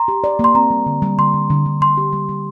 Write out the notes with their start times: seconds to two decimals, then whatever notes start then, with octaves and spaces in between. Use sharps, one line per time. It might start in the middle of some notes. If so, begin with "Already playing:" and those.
Already playing: A#5 C6
0.08 G4
0.24 D5
0.39 A#3 C6
0.55 C4 A#5
0.70 G3
0.86 D3
1.02 G3
1.18 D3 C6
1.34 D3
1.50 D3
1.65 D3
1.81 G3 C6
1.97 G4
2.13 G3
2.29 G3